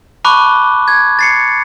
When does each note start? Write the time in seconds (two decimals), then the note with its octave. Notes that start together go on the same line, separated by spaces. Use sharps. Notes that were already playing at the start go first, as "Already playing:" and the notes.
0.25 A5 B5 C#6 D6 F#6
0.88 G#6
1.19 A6 C7 C#7